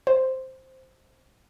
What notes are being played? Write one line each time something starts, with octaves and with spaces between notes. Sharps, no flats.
C5